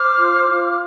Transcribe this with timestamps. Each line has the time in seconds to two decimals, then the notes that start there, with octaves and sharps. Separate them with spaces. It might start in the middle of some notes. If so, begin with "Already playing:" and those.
Already playing: C5 D6 F6
0.18 F4
0.48 F4